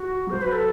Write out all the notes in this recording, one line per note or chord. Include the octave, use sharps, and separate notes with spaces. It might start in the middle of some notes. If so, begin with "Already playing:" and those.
Already playing: F#4
F#3 C5
B4
A4